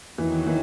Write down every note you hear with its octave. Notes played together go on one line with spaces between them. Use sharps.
E2 D#3 E3 F#3
E3